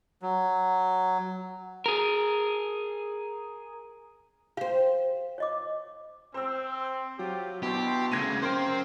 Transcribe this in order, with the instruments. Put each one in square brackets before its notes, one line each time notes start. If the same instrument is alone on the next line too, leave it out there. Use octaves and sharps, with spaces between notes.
[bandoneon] F#3
[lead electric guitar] G#4 A#4
[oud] G4 C5 [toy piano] F5
[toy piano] C#5 D#5 D6
[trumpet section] C4 [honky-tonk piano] C5 E6
[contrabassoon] F#3 [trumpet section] F4 G4
[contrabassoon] B2 [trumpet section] D4 E4 C6 [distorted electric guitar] G4
[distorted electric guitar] D2 C#3 [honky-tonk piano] G#6 A#6 D#7
[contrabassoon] F#2 [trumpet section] A#3 A#4 [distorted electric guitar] C5 G5 [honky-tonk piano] C6